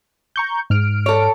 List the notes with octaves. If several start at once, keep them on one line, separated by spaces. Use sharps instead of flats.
A#5 C#6 G6
G#2 F6 D7
A4 C#5